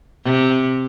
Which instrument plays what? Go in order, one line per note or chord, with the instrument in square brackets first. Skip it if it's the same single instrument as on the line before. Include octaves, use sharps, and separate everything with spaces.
[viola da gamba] C3